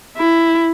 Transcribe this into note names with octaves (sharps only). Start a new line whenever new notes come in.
E4